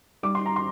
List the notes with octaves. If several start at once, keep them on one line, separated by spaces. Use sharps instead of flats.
G3 D6
C6
A#5
C6